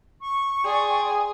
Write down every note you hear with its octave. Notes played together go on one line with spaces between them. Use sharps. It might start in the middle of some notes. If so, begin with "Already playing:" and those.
C#6
G#4 D5 G5 C6